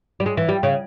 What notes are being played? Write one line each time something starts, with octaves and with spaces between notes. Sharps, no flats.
G3
G#3
E3
G3
C#3